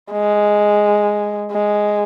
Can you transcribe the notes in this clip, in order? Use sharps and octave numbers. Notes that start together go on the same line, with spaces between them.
G#3
G#3